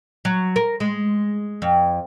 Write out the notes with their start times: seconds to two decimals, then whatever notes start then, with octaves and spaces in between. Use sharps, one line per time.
0.25 F#3
0.56 A#4
0.80 G#3
1.62 F2